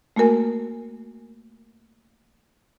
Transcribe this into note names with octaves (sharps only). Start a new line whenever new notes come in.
A3 A#3 F#4 A#4 G#5